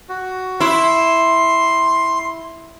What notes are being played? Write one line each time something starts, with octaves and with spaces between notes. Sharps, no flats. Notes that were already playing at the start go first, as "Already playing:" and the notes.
F#4
E4 C6